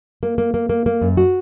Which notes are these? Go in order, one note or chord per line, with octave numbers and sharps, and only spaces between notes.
A#3
A#3
A#3
A#3
A#3
F#2
F#4